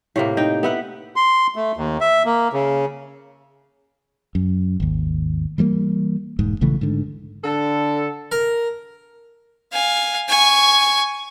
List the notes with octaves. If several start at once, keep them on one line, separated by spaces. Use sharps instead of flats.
A2 C3 A#3
D#4 G5
B3 E5 F#5
C6
A3
D#2
E5
A#3
C#3
F#2
G#1 D#2
E3 G3 A3 A#3
E1 G#2
A#1 C#3 E3 A3
G#2 D3
D3 A4
A#4
F5 G#5
G#5 C#6